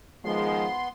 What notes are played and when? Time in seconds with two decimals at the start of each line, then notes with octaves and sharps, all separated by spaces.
0.25 D#3 F3 G#3 B3 C6